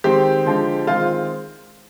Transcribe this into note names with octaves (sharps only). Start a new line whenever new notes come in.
D#3 G#3 C4 G4
D3 F3 G#3
D#3 G#3 C4 F4